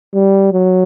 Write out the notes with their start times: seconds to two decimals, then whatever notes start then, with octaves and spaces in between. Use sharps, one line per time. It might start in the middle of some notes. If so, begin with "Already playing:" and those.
0.14 G3
0.53 F#3